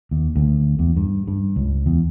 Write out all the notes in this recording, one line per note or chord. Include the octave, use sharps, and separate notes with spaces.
D#2
D2
E2
G2
G2
C#2
E2